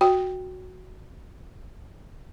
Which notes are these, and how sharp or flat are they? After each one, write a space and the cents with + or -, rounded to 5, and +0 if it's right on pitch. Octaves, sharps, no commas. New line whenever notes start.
F#4 +0 G5 +0